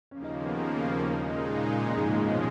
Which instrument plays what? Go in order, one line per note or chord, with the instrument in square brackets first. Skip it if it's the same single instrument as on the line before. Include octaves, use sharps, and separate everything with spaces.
[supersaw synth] D#2 C#3 F3 A#3 [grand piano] C#4
[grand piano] D#4
C#4
B3
[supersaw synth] A#2 G#3 D#4 [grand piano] A#3
[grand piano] A#3
D#3
C#3
A#2
[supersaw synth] D#2 C#3 F3 G#3 [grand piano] A#2
[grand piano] G#2
A#2
A#2
B2